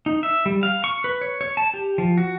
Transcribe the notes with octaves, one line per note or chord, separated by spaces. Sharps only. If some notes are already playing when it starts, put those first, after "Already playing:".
D#4
E5
G3
F5
C#6
B4
C#5
C#5
A5
G4
F3
F#4